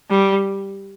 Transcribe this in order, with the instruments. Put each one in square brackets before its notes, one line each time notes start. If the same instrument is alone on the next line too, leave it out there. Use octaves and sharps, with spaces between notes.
[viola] G3